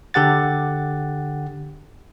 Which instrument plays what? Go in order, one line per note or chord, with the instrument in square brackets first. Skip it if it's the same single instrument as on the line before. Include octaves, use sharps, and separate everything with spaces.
[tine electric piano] D3 G4 F#5 A6